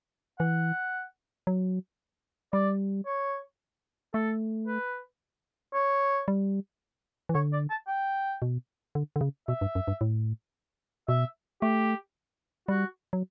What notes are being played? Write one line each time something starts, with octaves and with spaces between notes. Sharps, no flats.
E3 F#5
F#3
G3 D5
C#5
A3 A4
B4
C#5
G3
E3
D3 C#5
D5
A5
G5
B2
D3
D3
C#3
B2 E5
G2
F#2
G2
A2
B2 E5
A3 G4
G3 F#4
F#3